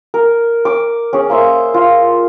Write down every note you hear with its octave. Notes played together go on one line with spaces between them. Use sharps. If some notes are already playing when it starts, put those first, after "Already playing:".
A#4
D6
C#4 G#4
A#3 C5 E5
F4